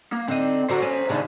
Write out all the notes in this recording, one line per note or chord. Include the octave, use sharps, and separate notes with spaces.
A#3
D3 C4 D#4
D3 F#4 C5 A#5
C#4
D#2 C#3 D4 D#4